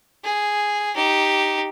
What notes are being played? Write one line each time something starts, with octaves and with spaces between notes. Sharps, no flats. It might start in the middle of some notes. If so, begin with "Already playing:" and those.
G#4
D#4 G4